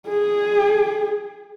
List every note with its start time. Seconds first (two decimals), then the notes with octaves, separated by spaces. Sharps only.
0.09 G#4